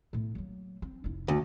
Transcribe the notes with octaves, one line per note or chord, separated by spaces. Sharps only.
A2 B3
F#3 A#3
C4
F1 E4
D2